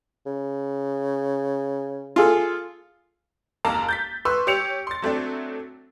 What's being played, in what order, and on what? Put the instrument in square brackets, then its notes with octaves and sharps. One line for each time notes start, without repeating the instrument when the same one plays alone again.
[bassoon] C#3
[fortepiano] F4 G#4 A4
[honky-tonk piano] F#1 D#2 A#3 A5 A#5
G6 A6 B6
B4 C6 C#6 E6
G4 C#5 C#7 F7
C6 A6
F#3 A3 C4 D4